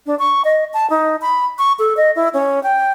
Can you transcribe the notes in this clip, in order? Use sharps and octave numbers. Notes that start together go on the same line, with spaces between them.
D4
C#6
D#5
A5
D#4
B5
C#6
A4
D#5
E4
C#4
G5